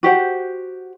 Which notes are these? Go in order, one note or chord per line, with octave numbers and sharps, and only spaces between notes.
F#4 G4 C5 F#5